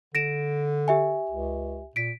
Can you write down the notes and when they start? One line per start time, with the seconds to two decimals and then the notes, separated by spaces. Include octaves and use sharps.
0.15 D3 A#6 D7 E7
0.88 G4 E5 G#5
1.30 C#2
1.96 A#2 B6 D7